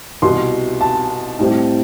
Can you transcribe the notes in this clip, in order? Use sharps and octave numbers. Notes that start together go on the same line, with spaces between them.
C2 B2 G3 C6
A5
A2 G3 C4